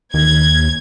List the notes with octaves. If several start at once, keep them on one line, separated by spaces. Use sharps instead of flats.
D#2 G#6